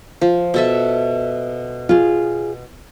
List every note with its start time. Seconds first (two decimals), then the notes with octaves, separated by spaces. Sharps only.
0.21 F3
0.54 B2 A4 E5
1.89 F4 G#4